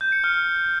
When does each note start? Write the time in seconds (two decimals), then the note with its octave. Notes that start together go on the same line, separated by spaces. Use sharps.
0.01 G6
0.12 C#7
0.24 F6